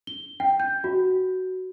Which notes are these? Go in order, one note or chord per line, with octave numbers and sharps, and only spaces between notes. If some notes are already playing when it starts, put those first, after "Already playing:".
G7
G5
G6
F#4